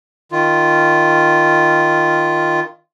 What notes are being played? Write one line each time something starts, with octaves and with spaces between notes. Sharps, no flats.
D#3 F4